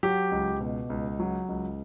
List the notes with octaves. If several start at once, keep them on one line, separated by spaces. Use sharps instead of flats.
F#3 G4
C#2
B2
C#2
F#3
C#2